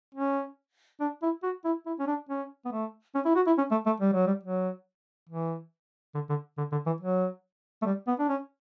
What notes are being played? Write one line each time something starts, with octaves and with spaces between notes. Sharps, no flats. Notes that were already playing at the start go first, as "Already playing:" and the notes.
C#4
D4
E4
F#4
E4
E4
C#4
D4
C#4
B3
A3
C#4
E4
F#4
E4
C#4
A3
A3
G3
F#3
G3
F#3
E3
D3
D3
D3
D3
E3
F#3
A3
G3
B3
D4
C#4